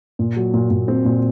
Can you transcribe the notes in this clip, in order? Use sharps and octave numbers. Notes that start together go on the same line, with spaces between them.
A#2
F#3
A#2
A#2
C4
A#2